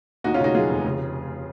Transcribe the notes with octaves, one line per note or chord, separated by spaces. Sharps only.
D#2 D#4 F#4
C#3 C#4 F4
D#4 F#4
F#3 F4 G#4
F1
C#3